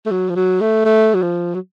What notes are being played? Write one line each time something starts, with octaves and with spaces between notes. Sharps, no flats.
A3
F#3
F3
F#3
A3
A3
F#3
F3
F#3